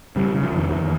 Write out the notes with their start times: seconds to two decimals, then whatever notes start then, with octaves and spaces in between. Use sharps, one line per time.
0.16 C#3 G3
0.35 C#3
0.43 F3
0.53 F2 D#3
0.70 E2 D#3